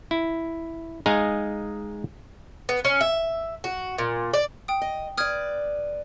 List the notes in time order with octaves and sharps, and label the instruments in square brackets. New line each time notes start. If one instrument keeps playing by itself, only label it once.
[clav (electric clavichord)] E4
G#3 D#4 G#4 F5 G#5 A#5
[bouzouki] B3
C#4
E5
F#4
A#2
D5
[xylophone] G5 D#6
[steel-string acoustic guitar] D#5
[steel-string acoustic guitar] B4 D5 [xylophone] D#6 F6 G#6